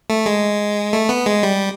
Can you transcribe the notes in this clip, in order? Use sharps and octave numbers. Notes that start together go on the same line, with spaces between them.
A3
G#3
A3
B3
G#3
G3